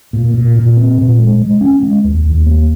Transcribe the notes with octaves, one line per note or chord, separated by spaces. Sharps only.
A#2
A#2
A#2
C4
A#2
G#3
G#3
C#4
G#3
D#2
D#2
A#3